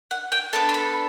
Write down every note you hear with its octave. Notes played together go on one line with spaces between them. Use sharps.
F#5
G5
B3 D4 A4 A5
C6
B5